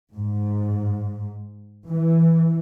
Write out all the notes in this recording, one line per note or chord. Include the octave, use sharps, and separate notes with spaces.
G#2
E3